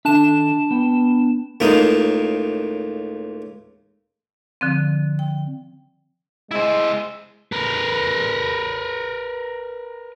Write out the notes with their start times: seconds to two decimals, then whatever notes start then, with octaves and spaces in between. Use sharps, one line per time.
0.05 D#3 D4 A4 E5 A5 E7
0.71 B3 G5
1.60 C#2 A2 A#3 D#4
4.61 D3 F3 C4
5.19 G5
6.51 G#3 E4 C5
7.52 A#4 B4